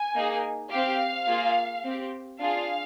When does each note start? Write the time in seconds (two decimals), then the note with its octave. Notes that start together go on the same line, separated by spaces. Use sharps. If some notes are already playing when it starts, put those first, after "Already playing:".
Already playing: G#5
0.15 A#3 D#4 G#4
0.71 C4 G4 F5
1.27 A#3 F4 G#4
1.84 C4 G4
2.40 D4 F4 G#4 F5